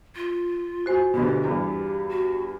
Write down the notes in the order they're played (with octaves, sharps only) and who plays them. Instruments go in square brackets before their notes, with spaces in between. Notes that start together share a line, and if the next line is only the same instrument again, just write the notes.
[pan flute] F4
[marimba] F#4 C5 G#5
[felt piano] D2 B2 [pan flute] G4
[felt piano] E2 G2
[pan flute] F#4